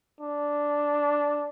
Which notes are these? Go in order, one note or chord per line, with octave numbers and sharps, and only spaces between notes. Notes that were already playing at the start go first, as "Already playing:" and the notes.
D4